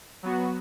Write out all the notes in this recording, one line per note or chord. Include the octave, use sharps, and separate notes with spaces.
F#3 B3 F#4